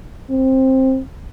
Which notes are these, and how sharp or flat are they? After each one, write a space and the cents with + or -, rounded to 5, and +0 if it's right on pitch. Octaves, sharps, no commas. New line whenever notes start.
C4 +10